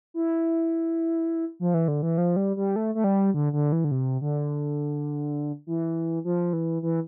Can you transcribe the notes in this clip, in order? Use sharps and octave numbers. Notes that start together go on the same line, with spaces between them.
E4
F3
E3
D3
E3
F3
G3
G3
A3
A3
G3
D3
D3
E3
D3
C3
D3
E3
F3
E3
E3